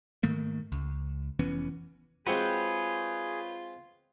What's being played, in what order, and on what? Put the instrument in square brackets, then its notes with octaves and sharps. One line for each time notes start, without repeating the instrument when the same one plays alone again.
[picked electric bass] G#2 D#3 A3 A#3
C#2
F1 E3 B3 C#4
[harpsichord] G#3 C4 F#4 [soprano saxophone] F4 [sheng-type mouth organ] G#4 [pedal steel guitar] B4 C#5 G5